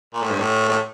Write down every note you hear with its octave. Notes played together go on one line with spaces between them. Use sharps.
A#2
A2
G2
A2
A2